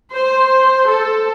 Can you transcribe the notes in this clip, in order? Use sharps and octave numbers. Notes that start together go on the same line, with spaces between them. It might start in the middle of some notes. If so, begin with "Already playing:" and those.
C5
A4